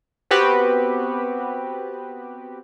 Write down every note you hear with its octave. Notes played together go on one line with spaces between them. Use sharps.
B3 C4 F#4 G4 B4